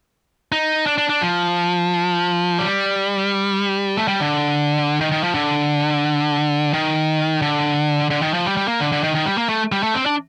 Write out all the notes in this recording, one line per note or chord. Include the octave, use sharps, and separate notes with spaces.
D#4
D4
D4
D4
F3
G3
A3
G3
D3
D#3
D#3
F3
D3
D#3
D3
D3
D#3
F3
G3
G3
A#3
D3
D3
D#3
D#3
G3
A#3
A3
G3
A3
C4
D4